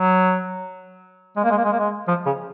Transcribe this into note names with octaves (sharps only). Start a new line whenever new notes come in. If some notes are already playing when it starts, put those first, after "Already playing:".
Already playing: F#3
G#3
A#3
G#3
A#3
G#3
A#3
G#3
F3
C#3